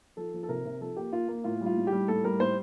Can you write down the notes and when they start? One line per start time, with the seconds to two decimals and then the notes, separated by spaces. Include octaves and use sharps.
0.17 F3 A4
0.34 F3
0.43 A4
0.49 C3 A#4
0.65 C3
0.81 F3 A4
0.97 A#3 G4
1.13 A#3 F4
1.28 A#3
1.44 A2 F4
1.61 G3
1.66 F4
1.76 A2
1.87 G4
1.92 G3
2.08 A2 A4
2.24 G3 A#4
2.40 A2 C5